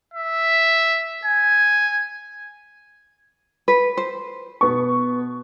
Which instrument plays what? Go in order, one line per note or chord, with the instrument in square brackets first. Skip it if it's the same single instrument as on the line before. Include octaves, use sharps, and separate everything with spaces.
[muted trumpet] E5
G#5
[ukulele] B4
C5
[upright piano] B2 B3 C#6